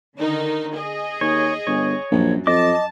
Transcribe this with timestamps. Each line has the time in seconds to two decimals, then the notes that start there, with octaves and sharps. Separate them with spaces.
0.17 D3 D#3 D#4
0.76 G#4 D#5
1.21 D#2 C#5
1.67 G1 C#5
2.12 A#1 F#2
2.47 F2 D#5 A5 D6